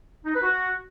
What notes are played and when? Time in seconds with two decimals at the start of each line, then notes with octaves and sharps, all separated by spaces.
0.25 D#4
0.33 B4
0.42 F#4